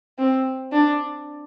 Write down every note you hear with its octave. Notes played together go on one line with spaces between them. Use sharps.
C4
D4